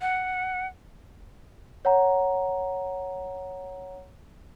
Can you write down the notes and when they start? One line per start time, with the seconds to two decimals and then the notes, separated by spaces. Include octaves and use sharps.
0.01 F#5
1.85 C#5 F#5 A#5